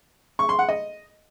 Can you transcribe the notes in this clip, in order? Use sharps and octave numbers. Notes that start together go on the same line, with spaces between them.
C#6
C6
F#5
D#5